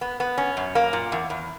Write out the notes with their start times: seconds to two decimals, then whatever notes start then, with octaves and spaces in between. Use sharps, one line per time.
0.01 B3
0.20 B3
0.38 C#4
0.57 F#2
0.75 A#3
0.93 A#2
1.12 E2
1.30 E2